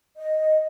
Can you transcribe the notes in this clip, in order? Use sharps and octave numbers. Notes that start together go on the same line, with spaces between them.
D#5